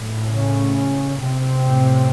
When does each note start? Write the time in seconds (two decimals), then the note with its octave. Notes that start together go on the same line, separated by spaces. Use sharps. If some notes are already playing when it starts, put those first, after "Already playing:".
Already playing: A2
0.28 C#3 C#4
1.20 C3 C4
1.65 A2